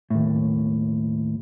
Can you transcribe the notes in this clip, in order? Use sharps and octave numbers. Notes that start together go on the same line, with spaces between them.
D#2 A2